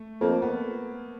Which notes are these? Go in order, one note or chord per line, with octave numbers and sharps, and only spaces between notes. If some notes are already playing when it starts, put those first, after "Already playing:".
Already playing: A3
F2 A#3
B3